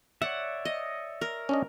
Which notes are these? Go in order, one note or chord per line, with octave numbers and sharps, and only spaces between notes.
C#5 D5 E5 F#5
D#5
A#4
C#4 D4 D#5